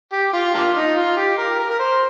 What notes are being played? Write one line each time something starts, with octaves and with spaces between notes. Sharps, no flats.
G4
F4
A#3 D4 F4
D#4
F4
G4
A#4
A#4
A#4
C5